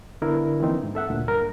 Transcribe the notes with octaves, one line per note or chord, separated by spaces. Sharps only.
D3 B3 D4 E4 A#4
E3 F3 A#3 C4 D#4
G#2
A4 E5 F#5
D2 A#2 D3
G2 A#4